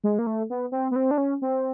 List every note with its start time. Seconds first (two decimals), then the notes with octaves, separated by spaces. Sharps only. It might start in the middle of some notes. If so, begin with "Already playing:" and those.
0.04 G#3
0.19 A#3
0.27 A3
0.50 B3
0.72 C4
0.91 B3
0.96 C4
1.11 D4
1.18 C#4
1.42 C4